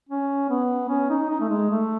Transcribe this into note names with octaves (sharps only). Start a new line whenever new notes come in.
C#4
B3
C#4
D#4
D#4
A3
G#3
A3